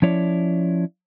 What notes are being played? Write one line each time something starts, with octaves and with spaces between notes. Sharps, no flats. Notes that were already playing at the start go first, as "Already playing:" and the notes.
F3 C#4 E4 C#5 D5